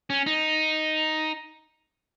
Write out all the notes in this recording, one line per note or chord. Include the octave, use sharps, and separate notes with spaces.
C#4
D#4